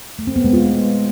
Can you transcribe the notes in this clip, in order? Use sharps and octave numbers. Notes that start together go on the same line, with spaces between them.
A3
C4
B3
G#3
F4